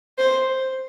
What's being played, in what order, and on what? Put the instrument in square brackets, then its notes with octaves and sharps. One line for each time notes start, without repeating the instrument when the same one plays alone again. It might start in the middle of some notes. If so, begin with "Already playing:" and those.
[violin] C5